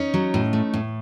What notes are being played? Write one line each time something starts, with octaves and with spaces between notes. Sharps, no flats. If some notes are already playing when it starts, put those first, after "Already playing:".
Already playing: C#4 D#4
F#3
A2
A3
A2